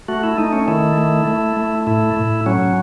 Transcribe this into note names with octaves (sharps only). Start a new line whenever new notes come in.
A3 F#4
E4
A3 D#4
C#4
D#3 E4
A3
A3
A3
A2 E4
A2
F#3 C#4